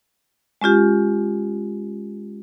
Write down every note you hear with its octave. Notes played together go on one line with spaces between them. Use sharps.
G#3 C#4 F4 G4